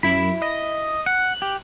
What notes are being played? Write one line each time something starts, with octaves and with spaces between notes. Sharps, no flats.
F#2 E4 B5
D#5
F#5 F#6
G4